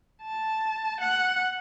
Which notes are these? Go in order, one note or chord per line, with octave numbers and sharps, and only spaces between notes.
A5
F#5